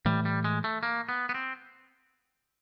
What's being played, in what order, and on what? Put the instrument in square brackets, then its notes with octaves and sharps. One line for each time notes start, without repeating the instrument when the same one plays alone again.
[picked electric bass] A2 E3 A3 [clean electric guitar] G3
[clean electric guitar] G3
G#3
A3
A#3
B3
B3
C4